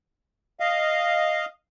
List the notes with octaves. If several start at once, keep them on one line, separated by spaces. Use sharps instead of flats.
D#5 F5